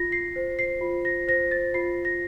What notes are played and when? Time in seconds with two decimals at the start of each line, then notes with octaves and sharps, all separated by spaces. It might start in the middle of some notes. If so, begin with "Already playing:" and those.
Already playing: F4 A#6
0.12 C7
0.36 C5
0.59 C7
0.81 F4
1.05 A#6
1.28 C5 A#6
1.51 A6
1.74 F4 C7
2.05 A#6